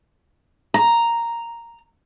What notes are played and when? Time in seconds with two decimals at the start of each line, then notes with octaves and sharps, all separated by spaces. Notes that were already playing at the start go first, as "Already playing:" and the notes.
0.74 A#5